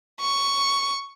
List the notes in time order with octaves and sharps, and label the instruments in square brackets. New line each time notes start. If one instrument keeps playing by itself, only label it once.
[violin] C#6